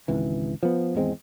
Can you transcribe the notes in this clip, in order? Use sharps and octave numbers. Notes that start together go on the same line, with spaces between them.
G#1 C#2 E3
F3 B3
G#1 E2 G#3 C4